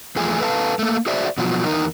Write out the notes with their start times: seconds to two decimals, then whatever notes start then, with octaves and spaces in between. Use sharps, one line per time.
0.16 E2 F3 A3 G#4 G#5
0.39 A4 B4 E5 F5 A5
0.79 A3 A#3
1.06 F#4 G#4 C5 D5 E5
1.38 B2 F3 F#3
1.65 E2 D#4 A#4